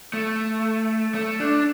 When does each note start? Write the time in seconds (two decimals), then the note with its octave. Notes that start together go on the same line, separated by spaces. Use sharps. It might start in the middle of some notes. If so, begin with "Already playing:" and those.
0.14 A3
1.15 A3
1.40 D4